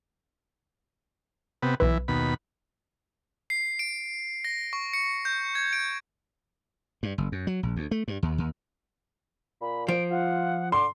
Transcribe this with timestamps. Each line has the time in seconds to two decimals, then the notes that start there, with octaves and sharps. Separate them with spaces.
1.62 C3 B3
1.80 B1 E3 B4
2.08 D#2 B2 B5
3.50 C7
3.79 D7
4.45 A#6
4.73 C#6
4.93 C#7
5.25 G6
5.55 G#6
5.73 D7
7.03 G2
7.18 F#1
7.32 F#2
7.47 F#3
7.63 A#1
7.76 D2
7.91 A3
8.08 G2
8.23 D#2
8.38 D#2
9.61 A#2 B5
9.88 F3 D7
10.11 F4 F#5
10.72 D3 C6 D6